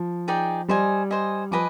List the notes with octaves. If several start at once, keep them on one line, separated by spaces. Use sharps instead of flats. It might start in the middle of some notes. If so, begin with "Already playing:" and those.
Already playing: F3
D#4 G#4 D5 G5
G3 C5 D#5 G#5
C5 D#5 G#5
F3 B4 D#5 G#5 D6